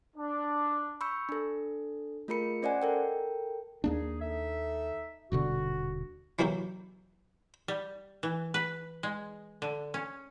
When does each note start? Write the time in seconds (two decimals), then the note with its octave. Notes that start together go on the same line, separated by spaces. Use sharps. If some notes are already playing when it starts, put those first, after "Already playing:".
0.16 D4
1.01 B5 C#6 E6 G6 C#7
1.29 D4 A4
2.28 A3 F4 G#4 A#4 B5 C#7
2.63 C#4 C5 D5 D#5 F#5 G#5
2.82 A4 A#4 G5
3.84 D#2 A#3 D4 D#4 G#4
4.21 D#4 A4 E5
5.32 D#1 B2 D3 F#4
6.39 E3 F#3 A#3 E4 G4
7.68 G3
8.23 E3
8.54 B4
9.03 G#3
9.62 D3
9.94 C#4